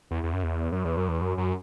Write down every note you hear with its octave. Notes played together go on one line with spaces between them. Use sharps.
E2
E2
F#2
E2
F#2
E2
F#2
E2
F#2
F#2